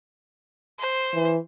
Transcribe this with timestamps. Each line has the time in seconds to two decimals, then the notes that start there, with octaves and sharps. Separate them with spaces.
0.79 C5
1.14 E3